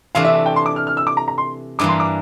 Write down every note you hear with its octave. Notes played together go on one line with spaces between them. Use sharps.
C3 E3 A3 D4 F5
E5
E5
G5
C6
D6
F6
F6
E6
D6
A#5
A#5
C6
G2 E3 G3 A#3 D6
C6
D6